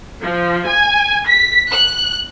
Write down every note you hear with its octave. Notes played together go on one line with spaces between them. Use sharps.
F3
G#5
B6
F#6